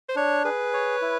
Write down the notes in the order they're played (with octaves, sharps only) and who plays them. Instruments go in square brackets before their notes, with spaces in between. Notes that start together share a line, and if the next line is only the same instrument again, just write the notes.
[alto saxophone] C5
[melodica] D4 [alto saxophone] C#5
[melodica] G#4 [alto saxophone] B4
[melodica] C#5
E4